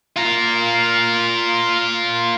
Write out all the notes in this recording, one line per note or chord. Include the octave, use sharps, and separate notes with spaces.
F4 A#4